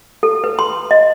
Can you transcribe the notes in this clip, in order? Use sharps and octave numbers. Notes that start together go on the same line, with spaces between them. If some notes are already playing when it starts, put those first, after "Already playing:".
A4
B4
C6
D#5